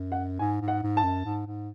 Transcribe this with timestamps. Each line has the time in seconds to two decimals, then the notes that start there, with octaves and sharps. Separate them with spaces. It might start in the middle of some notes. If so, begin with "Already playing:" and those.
Already playing: F#2
0.12 F#5
0.39 G#2 G#5
0.62 G#2
0.68 F#5
0.83 G#2
0.97 A5
1.04 F#2
1.26 G#2
1.47 G#2